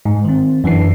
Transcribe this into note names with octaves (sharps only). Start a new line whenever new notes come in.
G#2
D#3 C4
F#2 E3 D4 C7